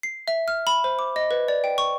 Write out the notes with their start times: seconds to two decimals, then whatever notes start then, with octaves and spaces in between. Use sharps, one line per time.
0.03 C7
0.28 E5
0.48 F6
0.67 B5
0.84 C5
0.99 D6
1.16 D#5
1.31 B4
1.48 D5
1.64 G5
1.78 C#6